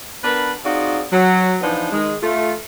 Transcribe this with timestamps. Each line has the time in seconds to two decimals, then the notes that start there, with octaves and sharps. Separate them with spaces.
0.23 B3 D4 A#4 B4
0.65 C4 D#4 F4 F#4 G#4 D5
1.11 F#3
1.62 E3 F3 B3 D4 D#4 F4
1.92 D#3 G#3
2.22 A3 F4